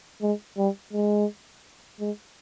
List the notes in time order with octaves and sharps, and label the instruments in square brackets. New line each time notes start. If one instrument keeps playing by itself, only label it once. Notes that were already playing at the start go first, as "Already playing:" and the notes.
[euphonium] G#3
G3
G#3
G#3